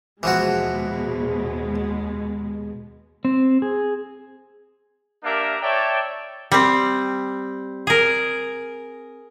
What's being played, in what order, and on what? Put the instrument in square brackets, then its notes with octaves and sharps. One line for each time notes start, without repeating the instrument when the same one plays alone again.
[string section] D#2 B2 G#3 [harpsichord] E3 F3 F#4
[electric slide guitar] C4
G#4
[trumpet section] A#3 D4 G4 A#4 E5
C#5 D5 E5 G5 A5
[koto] G3 C4
G#4 A#4